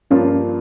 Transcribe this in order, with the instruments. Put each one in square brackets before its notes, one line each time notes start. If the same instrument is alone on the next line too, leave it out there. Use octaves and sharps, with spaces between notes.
[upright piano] G2 F3 A#3 F4 [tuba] C#4